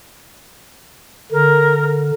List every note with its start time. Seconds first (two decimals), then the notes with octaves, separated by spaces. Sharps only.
1.32 D3 A#4